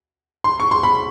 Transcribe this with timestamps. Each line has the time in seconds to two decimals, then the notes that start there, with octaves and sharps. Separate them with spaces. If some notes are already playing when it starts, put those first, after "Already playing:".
0.44 C6
0.60 C#6
0.71 C6
0.83 B5